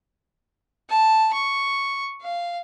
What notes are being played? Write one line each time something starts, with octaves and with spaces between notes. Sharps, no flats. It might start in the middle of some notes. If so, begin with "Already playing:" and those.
A5
C#6
F5